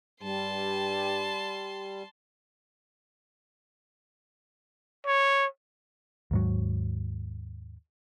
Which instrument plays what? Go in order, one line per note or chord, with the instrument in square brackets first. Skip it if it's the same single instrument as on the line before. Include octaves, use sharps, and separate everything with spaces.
[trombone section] G2 G4 [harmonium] G3 [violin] A5 C6
[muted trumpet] C#5
[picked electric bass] D#2 G#2 F#3